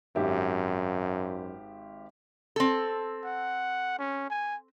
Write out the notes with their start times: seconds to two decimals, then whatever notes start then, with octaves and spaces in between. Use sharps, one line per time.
0.16 G#1 F#2 G4 E5
2.56 C4 A4
3.24 F#5
3.99 C#4
4.30 G#5